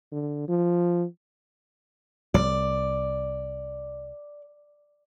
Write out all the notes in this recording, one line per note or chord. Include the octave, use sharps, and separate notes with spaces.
D3
F3
C2 D5